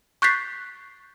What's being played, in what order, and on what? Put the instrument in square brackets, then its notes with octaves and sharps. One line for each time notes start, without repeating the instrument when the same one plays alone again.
[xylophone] C#6 F#6 G6 A6 B6 C7